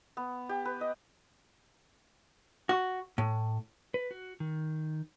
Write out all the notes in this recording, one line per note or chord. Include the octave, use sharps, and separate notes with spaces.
B3
G4
B4
D#5
F#4
A2
B4
F#4
D#3